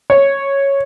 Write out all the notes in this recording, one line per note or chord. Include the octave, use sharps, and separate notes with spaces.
C#5